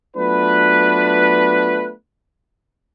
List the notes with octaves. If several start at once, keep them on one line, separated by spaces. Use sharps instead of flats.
F#3 A3 B3 D4 F4 B4